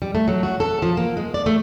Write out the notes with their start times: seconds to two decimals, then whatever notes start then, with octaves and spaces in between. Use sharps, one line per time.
0.02 G3
0.15 A3
0.28 F#3
0.43 F#4
0.60 A4
0.82 F3
0.97 A#3
1.17 G#3
1.34 D5
1.46 A3